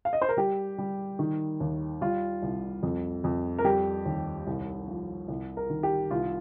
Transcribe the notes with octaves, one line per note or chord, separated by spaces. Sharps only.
F5
D#5
C5
A#4
G3 G4
G3
D#3
D#2
G3 F4
C2
F2
F2
A#4
G3 G4
D#2
C2
F3
C2
A#4
D#3
G4
C2 F4